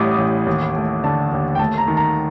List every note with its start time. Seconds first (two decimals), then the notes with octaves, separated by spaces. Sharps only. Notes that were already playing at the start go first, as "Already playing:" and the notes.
Already playing: A1 A2 G3 D6 D#6
0.18 A1
0.47 D#2
0.76 A3
1.04 D3 A5
1.32 D#2
1.55 G5
1.59 A3 A5
1.78 A#5
1.88 D#3
1.97 A#5